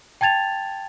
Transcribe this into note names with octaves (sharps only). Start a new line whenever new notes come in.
G5 A5 G#6 A6 F7